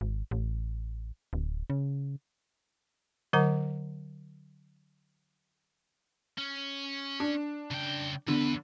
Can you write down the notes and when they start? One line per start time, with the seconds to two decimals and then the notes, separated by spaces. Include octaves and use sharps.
0.01 G#1
0.31 A1
1.33 D1
1.70 C#3
3.33 D3 F#3 A#4 F#5 A#5
6.38 C#4
7.20 D4
7.71 C#3 G5
8.28 E2 D3 B3 B4